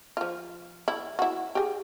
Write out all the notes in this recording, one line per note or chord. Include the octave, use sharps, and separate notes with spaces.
F3 F4
E4
E4 F#4
G4 G#4